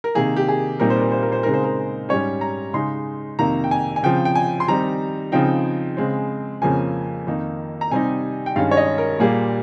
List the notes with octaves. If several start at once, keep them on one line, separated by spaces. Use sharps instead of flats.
A#4
C3 D#3 A#3 G#4
G4
G#4
A#2 G3 C4 D#4 A#4
C5
A#4
C5
A#4
C5
C#3 G#3 C4 D#4 A#4
C5
A#4
G#2 G3 C#4 C#5
A#5
C#3 G#3 D#4 C6
F2 C3 D#3 A#3 A#5
G5
G#5
G#5
C#3 F3 C4 G5
G5
G#5
C6
D#3 G3 C4 D#4 A#5
C#3 F3 C4 D#4 G5
C#3 G#3 C4
F2 C#3 F3 A#3 C#4 G#5
F2 D#3 A#3 D#4
A#5
C3 G3 C4 D#4 G#5
G5
G2 D#3 G#3 C#4 F5
C#5
D#5
A#4
A#2 G3 A#3 G#4